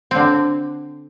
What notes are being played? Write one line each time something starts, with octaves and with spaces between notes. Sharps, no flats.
D3 C4